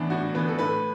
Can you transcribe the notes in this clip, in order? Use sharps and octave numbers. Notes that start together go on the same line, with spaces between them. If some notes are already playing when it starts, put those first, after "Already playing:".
Already playing: A2 E3 B3 D4
A2 F#4
E3 B3 B4
A4
A2 B4